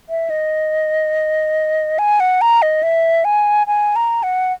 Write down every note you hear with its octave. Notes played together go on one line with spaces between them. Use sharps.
E5
D#5
G#5
F#5
A#5
D#5
E5
G#5
G#5
A#5
F#5